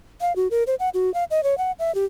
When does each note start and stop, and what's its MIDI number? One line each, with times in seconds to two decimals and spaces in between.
0.21 0.35 77
0.36 0.48 66
0.51 0.63 70
0.67 0.75 72
0.80 0.89 78
0.94 1.13 66
1.14 1.24 77
1.31 1.43 75
1.43 1.57 73
1.58 1.72 78
1.79 1.94 76
1.95 2.05 67